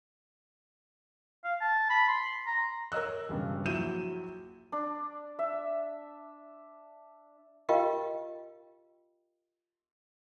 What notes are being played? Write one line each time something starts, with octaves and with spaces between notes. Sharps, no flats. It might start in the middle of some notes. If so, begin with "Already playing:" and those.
F5
A5
B5
C6
A#5
A#4 C#5 D#5 E6 F#6
E1 G2 C#3
A#1 F#3 E4 G6 D#7 E7
D4
E5
F4 G4 A#4 D#5 F5 G5